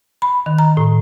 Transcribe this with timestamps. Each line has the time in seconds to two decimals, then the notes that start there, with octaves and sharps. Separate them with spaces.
0.22 B5
0.46 D#3
0.59 A#5
0.77 A2